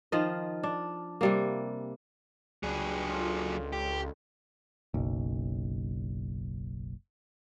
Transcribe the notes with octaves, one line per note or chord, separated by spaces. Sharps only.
D#3 F3 F4 D#5
D4
C3 G3 A#3
C#2 F#3 G3 D4 G#4
F4 A4
G4
F#1 B1